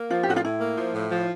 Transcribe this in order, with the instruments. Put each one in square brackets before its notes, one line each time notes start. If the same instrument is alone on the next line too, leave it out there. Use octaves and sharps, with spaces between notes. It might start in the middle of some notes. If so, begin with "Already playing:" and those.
Already playing: [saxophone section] A#3
[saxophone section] F3 [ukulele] F4
[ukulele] G4
[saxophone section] A2 [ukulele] F#4
[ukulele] F4
[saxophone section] A2 [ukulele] E4
[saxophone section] A#3
F3
A2
F3